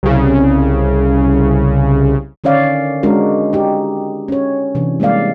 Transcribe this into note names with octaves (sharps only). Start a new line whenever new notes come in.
C2 C#3
D3 D#3 C#4 C#5 D5 F5
G#3 C#4 D4 F#4 A#4
D#4 G4
C#4 C#5
C3 E3 D4
G3 G#3 A#3 D5 F5